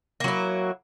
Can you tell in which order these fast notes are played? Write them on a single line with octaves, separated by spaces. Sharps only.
A#3 F#3 E4